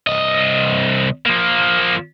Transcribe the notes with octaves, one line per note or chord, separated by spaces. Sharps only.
C2 D#5
F3 A#3